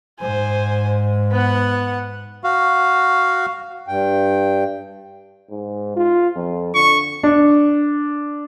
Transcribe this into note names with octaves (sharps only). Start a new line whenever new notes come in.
G#2 C5 G#5
B3 F#5
F#4 F5
G2 G5
G#2
F4
F2
D3 C#6
D4